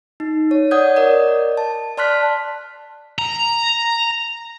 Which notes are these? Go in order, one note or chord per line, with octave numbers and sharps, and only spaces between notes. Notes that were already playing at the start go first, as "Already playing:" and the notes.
D#4
C#5
C#5 D5 F#5 D#6 G6 G#6
A#4 D5 D#5
A5
D5 A5 C6 F6 F#6 B6
A#5